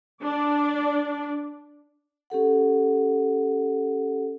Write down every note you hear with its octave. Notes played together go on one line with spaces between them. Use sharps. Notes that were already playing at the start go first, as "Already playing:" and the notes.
D4 D5
C#4 G4 A4 F#5